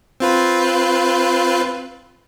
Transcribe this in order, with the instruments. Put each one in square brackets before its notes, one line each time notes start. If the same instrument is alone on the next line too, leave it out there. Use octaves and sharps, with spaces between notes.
[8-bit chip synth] C4 F4 B4